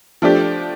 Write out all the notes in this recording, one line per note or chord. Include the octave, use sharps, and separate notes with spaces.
F3 A3 D4 G4 D5